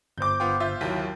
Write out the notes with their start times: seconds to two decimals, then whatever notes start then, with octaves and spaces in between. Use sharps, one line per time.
0.18 G1 C5 D6 G6
0.40 B3 F4 G5
0.60 F4 E5 G6
0.81 D#2 F#3 E4 B6